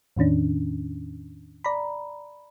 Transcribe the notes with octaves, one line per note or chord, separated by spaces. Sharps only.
E2 A2 D#3 C#4 D4
D5 A#5 B5